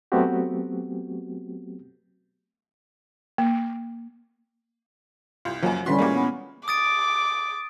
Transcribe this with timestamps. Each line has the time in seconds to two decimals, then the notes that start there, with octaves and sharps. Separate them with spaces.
0.12 F#3 A3 B3 C4 F#4 G4
3.38 A#3
5.45 C2 F4
5.63 C#2 F#2 F3 F#3 A#3
5.86 D3 E3 G3 C#4 F#4 C6 B6
5.99 A#2 E3 G#3 A#3 G4
6.14 B3
6.68 D6 D#6 A6 D7